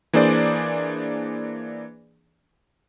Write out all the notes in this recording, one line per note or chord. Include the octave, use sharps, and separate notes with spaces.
E3 A#3 D4 G#4 C5 D5